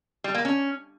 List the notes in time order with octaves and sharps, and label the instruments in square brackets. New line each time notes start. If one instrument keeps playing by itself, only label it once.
[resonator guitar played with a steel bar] G3
A#3
C#4